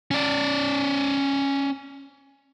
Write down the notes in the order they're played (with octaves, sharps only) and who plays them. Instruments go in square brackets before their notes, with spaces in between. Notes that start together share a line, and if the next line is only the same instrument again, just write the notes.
[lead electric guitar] C#4 D5